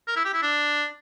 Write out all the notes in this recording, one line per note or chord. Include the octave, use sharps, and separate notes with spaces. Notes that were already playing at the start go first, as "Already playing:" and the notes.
A#4
E4
G4
E4
D4